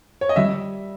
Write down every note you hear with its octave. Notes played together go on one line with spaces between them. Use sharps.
C#5
D#5
G3 E5